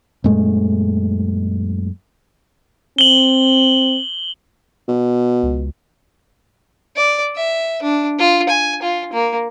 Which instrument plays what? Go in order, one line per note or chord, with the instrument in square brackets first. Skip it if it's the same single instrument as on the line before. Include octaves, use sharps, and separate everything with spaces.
[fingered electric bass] F#2 A#2 G#3 A3
[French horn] C4 [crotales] F#7 G7
[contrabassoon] B2
[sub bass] C#2
[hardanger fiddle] D5
E5
D4
F4
G#5
F4
A#3